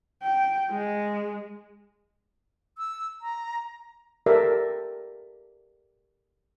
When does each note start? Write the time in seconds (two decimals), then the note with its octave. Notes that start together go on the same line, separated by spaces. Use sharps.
0.23 G5
0.71 G#3
2.78 E6
3.21 A#5
4.26 G4 A4 A#4 D5 E5